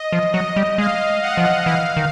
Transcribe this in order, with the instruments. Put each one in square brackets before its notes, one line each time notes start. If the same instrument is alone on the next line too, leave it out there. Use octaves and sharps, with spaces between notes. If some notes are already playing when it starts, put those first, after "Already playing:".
Already playing: [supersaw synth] D#5
[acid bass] F3
[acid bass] F#3 [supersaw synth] D#5
[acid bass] G3
[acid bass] G#3 [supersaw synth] F5
[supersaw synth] F#5
[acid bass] F3
[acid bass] E3 [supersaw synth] F5
[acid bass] D#3